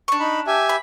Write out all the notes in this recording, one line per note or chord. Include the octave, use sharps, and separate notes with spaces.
D4 C#6
D#4 B5
G4 E5 G#5
B5